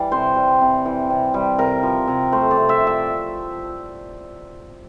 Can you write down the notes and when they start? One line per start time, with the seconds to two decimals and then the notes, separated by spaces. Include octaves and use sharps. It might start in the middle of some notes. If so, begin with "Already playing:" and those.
Already playing: E3 G3 D5
0.12 C3 C5
0.36 G3
0.61 C3
0.85 E3
1.10 C3
1.34 G3
1.58 C3 A#4
1.83 F3
2.08 C3
2.32 A3 C5
2.51 D5
2.57 C3
2.69 E5
2.81 F3
2.87 E5